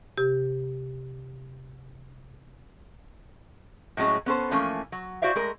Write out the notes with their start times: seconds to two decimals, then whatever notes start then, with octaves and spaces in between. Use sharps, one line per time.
0.17 C3 G4
3.97 A2 F#3 G#3 C#4 G#4
4.26 B3 C#4 A4 C5
4.51 E3 F3 A3 A#3 C#4
4.92 F#3
5.22 E4 F#4 C5 D5 E5 F5
5.36 G#3 A3 A#4